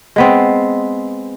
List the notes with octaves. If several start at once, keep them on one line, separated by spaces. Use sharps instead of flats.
G#3 B3 C4